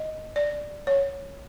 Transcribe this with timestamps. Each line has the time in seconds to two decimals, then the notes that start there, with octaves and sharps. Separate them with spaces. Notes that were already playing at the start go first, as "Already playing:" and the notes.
Already playing: D#5
0.36 D5
0.87 C#5